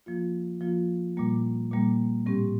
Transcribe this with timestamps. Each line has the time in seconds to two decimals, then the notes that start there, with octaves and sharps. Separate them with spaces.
0.06 F3 A#3 F4
0.61 F3 A#3 F4
1.17 A#2 G3 A#3
1.72 A#2 G3 A#3
2.26 A2 G3 C4 G4